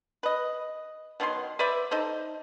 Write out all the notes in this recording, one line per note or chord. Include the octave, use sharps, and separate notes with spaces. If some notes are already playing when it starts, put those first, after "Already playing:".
B4 D#5
B2 D#3 F#3 C6
B4 C5 D5 E5
D#4 A4 C5